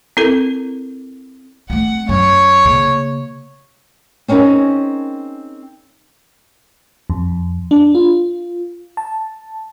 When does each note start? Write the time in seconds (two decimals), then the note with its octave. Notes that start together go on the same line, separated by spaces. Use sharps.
0.17 C4 E4 A4 A#4
1.70 A3 C4 F#5
2.09 F#2 F#3 C#5
2.65 C#3 A#3
4.28 C4 C#4 D#4 G#4 A#4
7.10 F2
7.71 D4
7.95 F4
8.97 A5